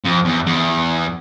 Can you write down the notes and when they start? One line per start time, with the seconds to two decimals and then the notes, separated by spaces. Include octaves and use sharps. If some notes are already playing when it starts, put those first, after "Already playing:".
0.05 F2
0.25 E2
0.47 E2